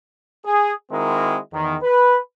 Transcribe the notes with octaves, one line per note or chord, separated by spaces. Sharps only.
G#4
D#3 G#3 C4 E4 F#4 A#4
E2 D#3
B4